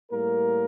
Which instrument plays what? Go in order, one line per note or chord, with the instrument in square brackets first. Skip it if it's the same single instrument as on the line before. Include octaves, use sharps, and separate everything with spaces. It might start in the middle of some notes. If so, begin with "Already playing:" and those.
[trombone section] A2 G3 A#3 A#4